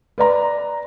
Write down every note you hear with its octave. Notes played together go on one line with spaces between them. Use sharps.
B4 D5 A#5